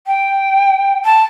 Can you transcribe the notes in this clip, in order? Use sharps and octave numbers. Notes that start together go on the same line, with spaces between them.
G5
A5